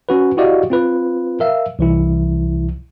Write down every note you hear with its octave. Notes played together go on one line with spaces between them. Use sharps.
C#4 F#4 B4
E4 F#4 G4 D5 D#5 F5
C4 F4 B4
A#4 E5 F5
C2 E3 E4